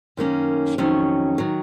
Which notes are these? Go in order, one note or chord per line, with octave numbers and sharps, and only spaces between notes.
F#2 D#3 A#3 C#4
F2 D#3 F#3 C#4
D#3 F#3